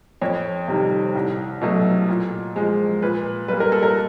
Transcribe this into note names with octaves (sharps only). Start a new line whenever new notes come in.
F2 C#5
C3 D#3 G3
C2
B2 F#3 A3
A#2
F3 G#3
A#2 B4
G3 A#3 B4
A#4
A4
A#4